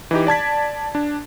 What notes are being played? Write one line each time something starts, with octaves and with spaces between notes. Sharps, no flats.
E3 D#4 G4
D5 A5 G#6 B6
D4